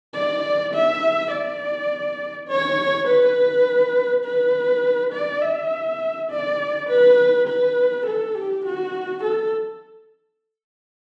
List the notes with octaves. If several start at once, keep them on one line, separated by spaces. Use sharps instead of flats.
D5
E5
D5
C#5
B4
B4
D5
E5
D5
B4
B4
A4
G4
F#4
A4